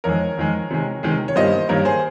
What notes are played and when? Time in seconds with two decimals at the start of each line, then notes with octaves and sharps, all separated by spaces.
0.04 F2 D#3 G#3 A#4 C#5
0.37 F2 D#3 G#3
0.71 C3 D#3 G#3
1.03 C3 D#3 G#3
1.28 C#5
1.36 G2 D#3 G3 A#3 C5 D#5
1.69 G2 D#3 G3 A#3 A#4 C#5
1.85 G#4 C5